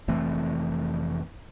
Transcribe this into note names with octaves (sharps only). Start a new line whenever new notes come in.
F1 E3 A3 C4